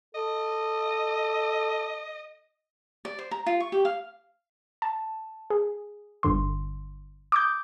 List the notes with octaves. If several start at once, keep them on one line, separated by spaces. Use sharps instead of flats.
A4 D#5
D5
C5
A#5
F4
C#6
G4
F5
A5
G#4
G1 G2 D3 C6
D6 D#6 G6